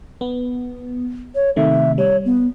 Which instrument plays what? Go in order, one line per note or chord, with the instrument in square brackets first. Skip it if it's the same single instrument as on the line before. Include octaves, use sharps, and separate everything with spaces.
[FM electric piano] B3
[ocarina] C#5
[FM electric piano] C3 D#3 A3 [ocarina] E5
[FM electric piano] G3 [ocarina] C#5
[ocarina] B3